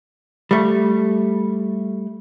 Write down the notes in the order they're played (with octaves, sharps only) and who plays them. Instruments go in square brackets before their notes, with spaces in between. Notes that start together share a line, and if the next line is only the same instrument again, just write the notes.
[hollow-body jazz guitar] G3 A3